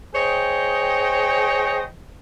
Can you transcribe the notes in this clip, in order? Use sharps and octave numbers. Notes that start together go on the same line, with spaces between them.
G#4 C5 C#5 D#5 G5